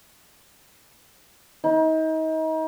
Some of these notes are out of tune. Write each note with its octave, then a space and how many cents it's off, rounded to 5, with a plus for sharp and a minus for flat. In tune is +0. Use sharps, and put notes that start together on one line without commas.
D#4 +35